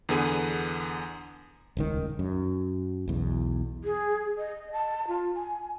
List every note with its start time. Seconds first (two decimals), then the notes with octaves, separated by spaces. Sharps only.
0.09 E2 D3 B3 G#4 D#7
1.77 D#1 C#2 D#3
2.19 F#2
3.08 B1 E2
3.84 G#4
4.38 D#5
4.73 A5
5.08 F4
5.35 G#5